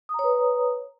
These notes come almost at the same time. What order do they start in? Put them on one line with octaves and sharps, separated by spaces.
D#6 A#5 C#5 B4